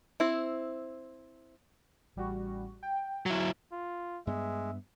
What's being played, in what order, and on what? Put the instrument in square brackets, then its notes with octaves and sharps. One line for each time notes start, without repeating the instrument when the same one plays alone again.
[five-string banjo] C4 E4
[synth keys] A1 G3 F#4
G5
[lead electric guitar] F#3 E4
[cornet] F4
[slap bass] G2 B3 [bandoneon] G#3 [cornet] E5